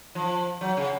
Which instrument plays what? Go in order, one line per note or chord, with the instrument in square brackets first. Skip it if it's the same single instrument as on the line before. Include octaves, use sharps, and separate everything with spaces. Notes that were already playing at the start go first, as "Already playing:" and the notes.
[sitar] F3
F#3
C#3